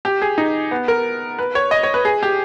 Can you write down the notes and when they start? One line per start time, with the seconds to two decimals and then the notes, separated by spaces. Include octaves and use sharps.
0.05 G4
0.22 G#4
0.38 D#4
0.71 B3
0.88 A#4
1.39 B4
1.55 C#5
1.71 D#5
1.83 C#5
1.94 B4
2.05 G#4
2.23 G4